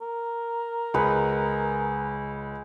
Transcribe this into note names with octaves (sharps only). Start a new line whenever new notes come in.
A#4
C#2 G#4 B4 F#5